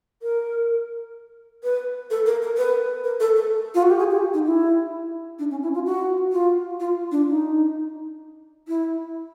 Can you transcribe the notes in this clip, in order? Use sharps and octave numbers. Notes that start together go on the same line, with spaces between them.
A#4
B4
A4
A#4
A#4
B4
A#4
A4
A4
F4
F#4
G4
G#4
G4
D#4
E4
D4
C#4
E4
F4
F#4
F4
F4
D4
D#4
E4